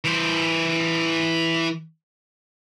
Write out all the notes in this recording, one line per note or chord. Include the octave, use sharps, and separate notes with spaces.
E3 C5